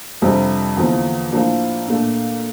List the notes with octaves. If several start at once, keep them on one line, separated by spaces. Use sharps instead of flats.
F2 C3 G3 D4
E2 D3 F3 A#3
A2 F3 A#3 D4
A#2 A3 D4